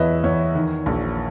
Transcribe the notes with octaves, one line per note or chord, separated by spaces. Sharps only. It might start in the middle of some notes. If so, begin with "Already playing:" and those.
Already playing: E2 E3 B4 C#5 D#5 E5
E2 C#5
D#3
A#1